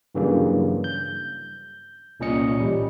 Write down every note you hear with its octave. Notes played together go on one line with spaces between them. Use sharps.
G2 C#3 E3 F#3 G3 A#3
G6
C2 A#2 C#4 D#5 C#7
A1 G3